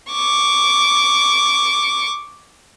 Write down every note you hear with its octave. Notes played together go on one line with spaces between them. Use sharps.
C#6 D6